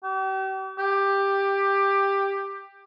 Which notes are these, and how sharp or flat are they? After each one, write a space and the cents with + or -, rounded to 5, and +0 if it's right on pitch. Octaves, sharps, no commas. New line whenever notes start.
G4 -40
G4 +10